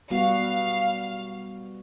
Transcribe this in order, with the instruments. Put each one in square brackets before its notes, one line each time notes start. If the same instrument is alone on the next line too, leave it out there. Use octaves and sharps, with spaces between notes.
[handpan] G3 B3 F#4 [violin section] F5